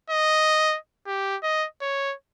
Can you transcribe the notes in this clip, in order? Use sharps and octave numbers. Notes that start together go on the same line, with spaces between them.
D#5
G4
D#5
C#5